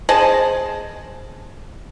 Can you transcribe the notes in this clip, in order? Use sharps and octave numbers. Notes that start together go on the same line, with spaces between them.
G#4 C5 D#5 A5